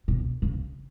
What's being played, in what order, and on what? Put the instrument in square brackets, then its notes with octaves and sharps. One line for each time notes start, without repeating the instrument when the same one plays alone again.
[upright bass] B2
C#3